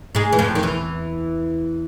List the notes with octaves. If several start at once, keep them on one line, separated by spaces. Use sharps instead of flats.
G#2 G#3
E3
F2 F3
D#3
E2 E3